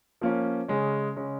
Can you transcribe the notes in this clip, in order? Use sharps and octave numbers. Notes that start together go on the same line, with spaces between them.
F3 A#3 C#4
C#3 G#3 C#4
C#3 G#3 C#4